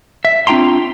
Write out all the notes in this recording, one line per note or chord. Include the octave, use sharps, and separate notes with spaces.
E5
C4 D4 F4 G5 A#5 C6